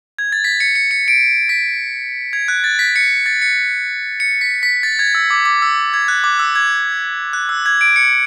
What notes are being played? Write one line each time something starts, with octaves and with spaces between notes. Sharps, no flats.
G#6
A6
B6
C#7
C#7
C#7
D7
B6
G#6
F#6
A6
B6
C#7
A6
C#7
C#7
B6
B6
A6
G#6
E6
D6
D6
E6
G#6
F#6
D6
E6
G#6
F#6
E6
G#6
D7
C#7